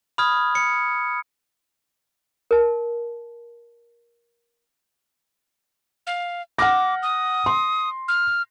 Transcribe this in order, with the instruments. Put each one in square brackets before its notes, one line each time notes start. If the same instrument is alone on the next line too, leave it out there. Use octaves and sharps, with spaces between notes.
[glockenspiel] B5 D#6 F6 G#6
C#7
[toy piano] A#4 A5
[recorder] F5
[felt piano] F#5 F6 A#6 [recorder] D6
[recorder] D#6
[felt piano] C6
[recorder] F6